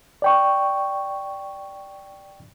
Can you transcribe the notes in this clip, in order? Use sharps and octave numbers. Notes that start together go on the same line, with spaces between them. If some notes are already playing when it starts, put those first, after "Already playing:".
D5 G5 C#6